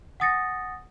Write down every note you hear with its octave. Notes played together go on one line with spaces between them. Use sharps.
F#5 G#5 D#6 A6 A#6 C#7